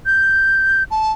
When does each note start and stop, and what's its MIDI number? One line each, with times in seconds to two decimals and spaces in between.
0.06 0.83 91
0.91 1.12 81